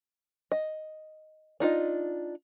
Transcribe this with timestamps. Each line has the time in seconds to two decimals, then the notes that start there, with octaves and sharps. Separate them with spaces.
0.52 D#5
1.60 D4 D#4 F4 D#5